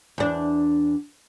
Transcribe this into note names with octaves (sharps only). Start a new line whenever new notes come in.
E2 D4